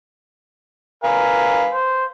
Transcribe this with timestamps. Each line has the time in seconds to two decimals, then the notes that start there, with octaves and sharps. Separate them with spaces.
1.04 A#4 B4 F5 G#5
1.72 C5